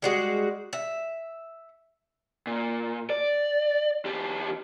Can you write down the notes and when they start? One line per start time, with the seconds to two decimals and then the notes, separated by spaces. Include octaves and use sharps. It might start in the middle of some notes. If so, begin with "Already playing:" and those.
0.02 G3 G#3 F#4
0.73 E5
2.47 A#2
3.10 D5
4.05 E2 G4